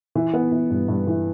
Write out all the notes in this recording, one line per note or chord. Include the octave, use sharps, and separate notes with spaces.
E3
B3
E3
G2
G2
E3